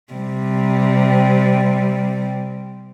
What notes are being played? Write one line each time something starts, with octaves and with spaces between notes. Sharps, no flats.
C3 G3